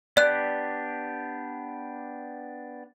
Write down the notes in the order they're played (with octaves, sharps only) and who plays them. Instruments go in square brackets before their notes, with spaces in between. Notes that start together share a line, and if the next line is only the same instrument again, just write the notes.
[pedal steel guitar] B3 D4 G4 [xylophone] D5 F#6